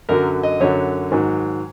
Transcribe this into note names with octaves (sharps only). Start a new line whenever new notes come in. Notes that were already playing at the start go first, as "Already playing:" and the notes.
F#2 D3 F#3 A#4
D#5
F#2 D3 F#3 C#5
G#2 D#3 F#3